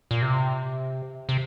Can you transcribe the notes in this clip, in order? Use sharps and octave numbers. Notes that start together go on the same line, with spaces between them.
A#2
C3
C3